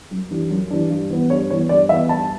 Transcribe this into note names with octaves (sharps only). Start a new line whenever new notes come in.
F#2
E3 G3 D4
F#2
E3 G3 D4
G2
E3 B3
G2 C#5
E3 B3 C#5
G2 D5
E3 B3 E5
G2 A5